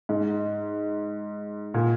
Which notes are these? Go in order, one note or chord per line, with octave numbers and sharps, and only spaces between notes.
G#2
A#2